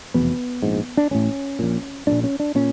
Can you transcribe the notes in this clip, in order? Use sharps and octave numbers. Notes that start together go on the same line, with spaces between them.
F1 E2 B2 B3
A#1 G#2
D4
A1 A2 C#4
A#1 A#2
A#1 A#2 D4
C#4
D4
A#2 C#4